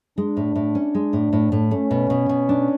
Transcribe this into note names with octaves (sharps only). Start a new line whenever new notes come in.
G#3 D4
A2
A2
C#4
G#3
A2
A2
A2
A3 C#4
B2
B2
B2
D4